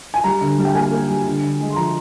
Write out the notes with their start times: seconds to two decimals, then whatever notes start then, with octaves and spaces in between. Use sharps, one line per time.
0.14 G#5
0.24 G3 A#5
0.41 D3
0.58 G3
0.65 G5
0.74 A#3 G#5
0.91 A#3
1.09 G3
1.26 D3
1.42 D3
1.60 G#3
1.70 C6
1.76 F3 A#5